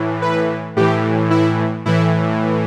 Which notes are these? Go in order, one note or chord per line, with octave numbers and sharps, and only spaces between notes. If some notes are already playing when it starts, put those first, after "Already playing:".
Already playing: A2 E3
B4
A2 E3 G4
E4
A2 E3 E4